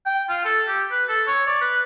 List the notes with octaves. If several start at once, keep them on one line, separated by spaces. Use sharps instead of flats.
G5
F4
A4
G4
B4
A4
C#5
D5
B4